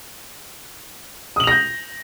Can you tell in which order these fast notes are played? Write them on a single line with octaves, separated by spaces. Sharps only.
D#6 F#7 F7 A#6 G6